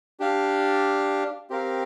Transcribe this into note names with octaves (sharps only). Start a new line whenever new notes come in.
D4 G4 D5 F5
C4 G4 A#4 F5